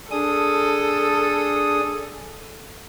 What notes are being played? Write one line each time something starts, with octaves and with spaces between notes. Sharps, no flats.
D4 G#4 A4 D#6